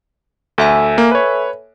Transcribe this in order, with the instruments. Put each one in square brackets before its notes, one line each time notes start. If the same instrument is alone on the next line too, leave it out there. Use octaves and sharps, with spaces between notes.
[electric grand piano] D2 [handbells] A4 E5 G#5
[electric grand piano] A#3
B4 C#5